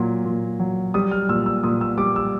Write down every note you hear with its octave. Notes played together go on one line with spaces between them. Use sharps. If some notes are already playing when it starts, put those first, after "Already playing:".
Already playing: A#2 F#3
A#2
F#3
G3 D#6
F6
A#2 E6
E6
A#2 D#6
E6
G3 D6
E6